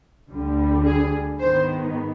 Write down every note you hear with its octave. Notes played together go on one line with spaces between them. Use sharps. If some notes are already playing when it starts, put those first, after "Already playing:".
D2 D3 G3
G#4
G#2 D#3 B3 C5